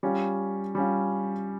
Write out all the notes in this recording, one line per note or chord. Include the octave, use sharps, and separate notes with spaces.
G3 C#4 F4
G3 C#4 F4